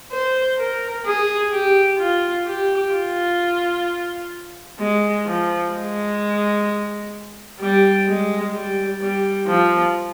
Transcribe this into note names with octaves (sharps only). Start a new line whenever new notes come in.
C5
A#4
G#4
G4
F4
G4
F4
G#3
F3
G#3
G3
G#3
G3
G3
F3